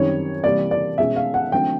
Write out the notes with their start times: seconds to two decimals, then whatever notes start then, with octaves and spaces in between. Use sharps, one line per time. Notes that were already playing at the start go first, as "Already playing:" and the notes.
Already playing: F#2 D#3 G3 C4 C#5
0.44 C3 E3 G3 A#3 D5
0.71 D5
0.98 B2 G#3 C#4 E5
1.16 F5
1.34 F#5
1.52 D3 F#3 A3 C4 G5